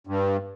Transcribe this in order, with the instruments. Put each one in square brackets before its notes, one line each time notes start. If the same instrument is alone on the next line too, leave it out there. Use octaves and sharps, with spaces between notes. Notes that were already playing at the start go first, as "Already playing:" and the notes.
[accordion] G2